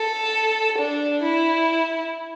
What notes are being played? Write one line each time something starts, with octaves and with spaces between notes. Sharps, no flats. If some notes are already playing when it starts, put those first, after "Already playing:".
Already playing: A4
D4
E4